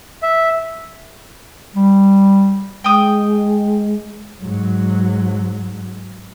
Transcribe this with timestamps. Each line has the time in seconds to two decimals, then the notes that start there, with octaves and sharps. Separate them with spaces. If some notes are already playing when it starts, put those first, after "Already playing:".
0.23 E5
1.76 G3
2.84 G#3 G5 D#6
4.41 G#2 F#3